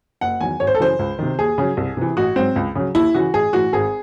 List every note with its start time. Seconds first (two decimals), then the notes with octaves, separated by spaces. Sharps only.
0.21 F#1 F#5
0.41 E2 D#3 F#3 G#5
0.60 G#1 C#5
0.67 C5
0.75 A4
0.80 F#2 C#3 E3 C5
0.99 C#2
1.19 C3 D#3
1.39 D#2 G#4
1.58 C#3 F#3
1.77 C2
1.97 C3 E3
2.17 A1 F#4
2.36 G#2 F#3 C4
2.56 C#2
2.75 C#3 F#3
2.95 D#2 E4
3.14 C#3 E3 F#4
3.34 A1 G#4
3.53 A2 E3 F#4
3.73 G#1 G#4